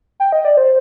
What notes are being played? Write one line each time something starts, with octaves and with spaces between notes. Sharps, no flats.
G5
D#5
D5
C5